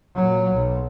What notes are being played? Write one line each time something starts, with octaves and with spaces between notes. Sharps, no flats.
A#2 F#3
B1